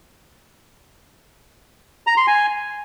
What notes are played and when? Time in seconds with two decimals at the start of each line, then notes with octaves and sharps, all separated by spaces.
2.07 A#5
2.17 C6
2.27 G#5